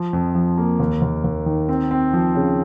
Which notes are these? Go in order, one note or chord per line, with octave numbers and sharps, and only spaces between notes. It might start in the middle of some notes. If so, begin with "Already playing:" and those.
Already playing: F3
F2
F3
A#3
D#2
D#2
D#2
D#3
C4
C4
F3
C#3